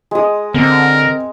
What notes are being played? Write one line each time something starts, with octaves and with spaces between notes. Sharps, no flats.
G#3 D#6
D3 C4 A#4